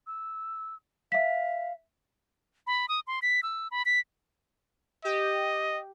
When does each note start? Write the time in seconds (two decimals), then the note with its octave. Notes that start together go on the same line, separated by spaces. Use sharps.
0.07 E6
1.12 E5 F5 B6
2.67 B5
2.88 D#6
3.07 C6
3.22 B6
3.43 E6
3.71 B5
3.86 B6
5.05 G4 D#5